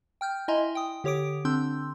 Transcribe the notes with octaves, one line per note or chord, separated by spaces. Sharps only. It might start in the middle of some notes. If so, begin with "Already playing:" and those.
G5 F6 G6
E4 D#5 E5 G#5 A#5 C6
G5 D#6
D3 G4 C#5 D6 D#6 D7
D3 C4 D4 C6 E6 G6